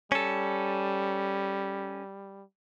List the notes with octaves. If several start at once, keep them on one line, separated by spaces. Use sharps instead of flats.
G3 C#4 A4